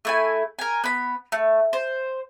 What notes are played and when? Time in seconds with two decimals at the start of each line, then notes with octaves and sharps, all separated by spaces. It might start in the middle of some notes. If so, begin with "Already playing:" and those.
0.05 A3 E4 G#5
0.59 A#4 G#5
0.84 B3 B5
1.32 A3
1.73 C5